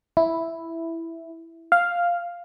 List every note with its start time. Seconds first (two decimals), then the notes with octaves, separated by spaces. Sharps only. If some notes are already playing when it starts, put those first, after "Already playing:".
0.17 E4
1.72 F5